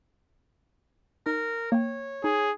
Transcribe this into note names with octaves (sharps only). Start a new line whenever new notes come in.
D#4 A#4
A#3 C#5 G5
D#4 G#4